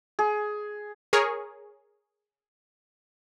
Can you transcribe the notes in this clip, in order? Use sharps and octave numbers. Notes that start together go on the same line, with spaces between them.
G#4
G#4 A#4 C#5